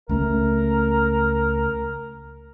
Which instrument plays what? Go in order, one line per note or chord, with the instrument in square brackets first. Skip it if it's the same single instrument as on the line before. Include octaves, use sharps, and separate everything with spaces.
[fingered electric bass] C#2 A3 C#4 [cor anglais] A#4